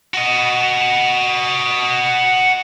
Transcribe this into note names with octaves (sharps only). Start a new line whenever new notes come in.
F#4 D#5